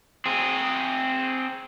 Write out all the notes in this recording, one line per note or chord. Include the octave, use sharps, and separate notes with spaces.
C4 G#4